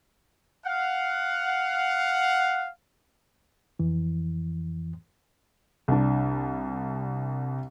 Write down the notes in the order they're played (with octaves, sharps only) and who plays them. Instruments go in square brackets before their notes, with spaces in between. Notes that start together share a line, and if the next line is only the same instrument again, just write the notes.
[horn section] F5 F#5
[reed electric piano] F2 E3
[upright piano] C2 D4